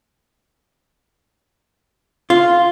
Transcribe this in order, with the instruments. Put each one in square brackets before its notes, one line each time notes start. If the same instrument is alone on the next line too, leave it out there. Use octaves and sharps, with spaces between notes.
[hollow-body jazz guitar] F4